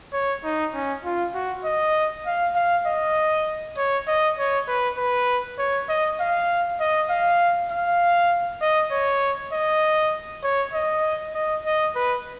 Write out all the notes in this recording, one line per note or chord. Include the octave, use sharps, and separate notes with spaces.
C#5
D#4
C#4
F4
F#4
D#5
F5
F5
D#5
C#5
D#5
C#5
B4
B4
C#5
D#5
F5
D#5
F5
F5
D#5
C#5
D#5
C#5
D#5
D#5
D#5
B4